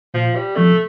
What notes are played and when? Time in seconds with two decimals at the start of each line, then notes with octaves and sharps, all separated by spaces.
0.14 A#2 F3
0.35 G3
0.56 F3 A3 C4